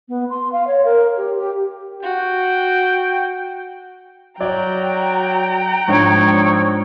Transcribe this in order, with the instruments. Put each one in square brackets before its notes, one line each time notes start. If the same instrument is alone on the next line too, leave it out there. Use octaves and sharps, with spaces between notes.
[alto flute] B3
C6
F5
C#5
A#4
G4
G4
[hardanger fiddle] F#4 [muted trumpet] G5
[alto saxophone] F#3 [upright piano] D5 [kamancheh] G5 A#5
[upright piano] G#2 D4 [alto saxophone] F3 [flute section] C#5 C#6 E6